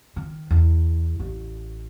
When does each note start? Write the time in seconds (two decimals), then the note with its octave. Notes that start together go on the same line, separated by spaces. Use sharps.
0.16 D#3
0.51 E2
1.20 A1